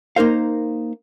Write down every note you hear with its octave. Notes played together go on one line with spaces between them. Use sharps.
A#3 D#4 A#4 C5 F5